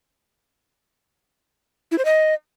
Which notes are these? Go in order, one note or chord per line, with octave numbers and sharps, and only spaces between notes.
E4
C5
D#5